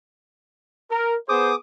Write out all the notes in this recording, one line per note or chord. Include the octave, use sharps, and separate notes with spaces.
A#4
B3 G#4 C5 D6 D#6